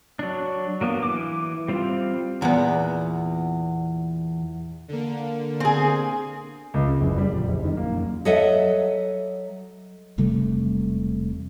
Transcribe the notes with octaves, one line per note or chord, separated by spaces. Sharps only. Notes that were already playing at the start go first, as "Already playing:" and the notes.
F#3 D4
F#3 A#3 B3
E3 D6
G3 C4 F4
E2 A#2 B3
D3 A#3
C4 G#4
C#2
C#3
F#1
G3
A#1
F#1
D#3
A#3
F#2
F#3 A4 D#5 E5 F#5
E1 C3 G3 A3